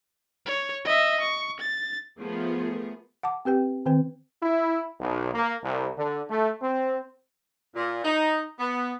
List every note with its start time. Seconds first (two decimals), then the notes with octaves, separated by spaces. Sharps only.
0.46 C#5
0.85 D#5 E5
1.21 C#6
1.60 A6
2.20 F3 A3 B3 G#4 A#4
3.23 F#5 A5 D6
3.45 C4 G4 B4 G5
3.86 D#3 C4 B4
4.42 E4
4.99 B1
5.32 A#3
5.63 C2
5.97 D3
6.29 A3
6.61 C4
7.75 A#2
8.04 D#4
8.59 B3